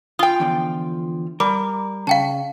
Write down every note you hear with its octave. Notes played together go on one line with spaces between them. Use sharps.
F4 G5 D#6 G7
E2 D3 F3
G3 A#4 D6
C#3 F5 G5 A5